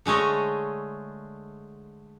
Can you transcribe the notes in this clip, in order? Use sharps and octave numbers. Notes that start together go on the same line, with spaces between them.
D3 G#3 A3 C#5 D#5